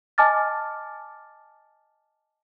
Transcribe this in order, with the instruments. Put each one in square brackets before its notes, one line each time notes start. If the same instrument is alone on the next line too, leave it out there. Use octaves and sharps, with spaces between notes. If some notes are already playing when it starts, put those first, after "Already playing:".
[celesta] D#5 G#5 A5 D6 F6 A6